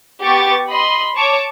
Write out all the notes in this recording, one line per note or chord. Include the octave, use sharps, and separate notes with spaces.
B3 G4 C#6 A6
D#5 B5 C6
C#5 A5 C#6 D6